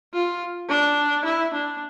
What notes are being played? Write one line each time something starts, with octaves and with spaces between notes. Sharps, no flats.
F4
D4
E4
D4